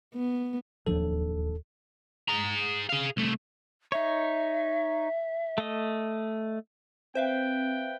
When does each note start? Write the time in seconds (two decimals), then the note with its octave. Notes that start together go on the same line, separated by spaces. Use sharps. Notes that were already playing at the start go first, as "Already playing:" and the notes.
0.14 B3
0.86 D1 D#2 F3 D4 A4
2.29 G#4 A#5
2.89 G#4 F5
3.17 C2 A3
3.92 D#4 C#5 E5
5.58 A3 D#5
7.15 C4 B4 C5 E5 F5 G5